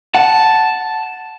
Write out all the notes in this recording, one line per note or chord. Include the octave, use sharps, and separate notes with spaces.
F#5 A5